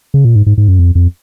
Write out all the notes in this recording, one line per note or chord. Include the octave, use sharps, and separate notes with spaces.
C#3
A#2
G#2
G#2
G#2
F#2
F2
F2